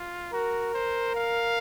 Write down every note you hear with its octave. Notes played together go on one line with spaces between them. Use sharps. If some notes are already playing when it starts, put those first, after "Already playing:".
Already playing: F4
F#4 A#4
C5
F5